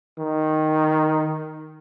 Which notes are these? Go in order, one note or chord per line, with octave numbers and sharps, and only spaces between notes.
D#3